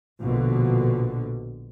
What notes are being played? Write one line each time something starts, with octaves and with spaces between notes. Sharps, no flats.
A#1 B2 D3